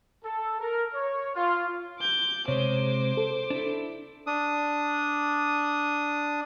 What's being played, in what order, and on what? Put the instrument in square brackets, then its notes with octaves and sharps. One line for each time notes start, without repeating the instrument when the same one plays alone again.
[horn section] A4
A#4
C#5
F4
[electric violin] D6 G6
[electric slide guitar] C3 G#3 [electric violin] C5 D6 [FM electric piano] C#5
[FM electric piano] A4
[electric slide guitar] D4 E4
[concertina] D4 D#6